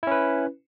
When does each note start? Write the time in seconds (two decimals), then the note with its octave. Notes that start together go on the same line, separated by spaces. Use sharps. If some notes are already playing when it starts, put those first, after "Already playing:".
0.03 E4
0.07 C#4
0.11 B4